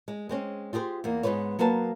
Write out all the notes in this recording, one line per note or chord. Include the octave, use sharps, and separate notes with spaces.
G#3
G#3 C4 C#4
F4 G4 G#4 A#4 C5
E2 A#3
G#2 G#3 B3 B4 C#5
F#3 A#3 B3 B4 A5